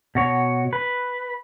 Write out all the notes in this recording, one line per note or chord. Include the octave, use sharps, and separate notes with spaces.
B2 F#4 C#5
B4